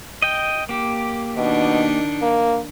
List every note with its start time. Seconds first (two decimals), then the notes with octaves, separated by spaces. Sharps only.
0.22 D#5 G5
0.69 A#3 G4
1.37 B2 D#3 D4 D#4
2.22 A#3